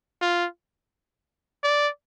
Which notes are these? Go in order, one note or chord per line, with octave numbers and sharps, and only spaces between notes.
F4
D5